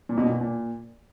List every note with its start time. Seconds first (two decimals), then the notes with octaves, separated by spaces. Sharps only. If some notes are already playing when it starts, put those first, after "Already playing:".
0.09 A#2
0.18 B2
0.25 A#2
0.41 A#2